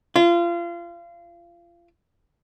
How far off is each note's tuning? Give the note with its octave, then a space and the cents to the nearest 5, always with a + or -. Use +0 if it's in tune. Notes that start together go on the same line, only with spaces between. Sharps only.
F4 -30